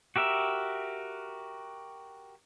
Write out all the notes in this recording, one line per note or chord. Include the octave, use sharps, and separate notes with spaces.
F#4 G4 A#4 E5